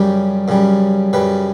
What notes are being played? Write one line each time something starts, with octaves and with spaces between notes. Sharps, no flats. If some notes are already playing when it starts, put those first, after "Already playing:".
Already playing: F#2 C#3 G3 G4
F#2 C#3 G3
F#2 C#3 G3 B4